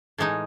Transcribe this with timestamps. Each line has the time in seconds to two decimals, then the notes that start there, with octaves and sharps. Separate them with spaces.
0.18 A2 E3 G#3 D#4